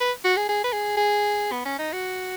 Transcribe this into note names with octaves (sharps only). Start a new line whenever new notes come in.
B4
F#4
G#4
G#4
B4
G#4
G#4
B3
C#4
D#4
F#4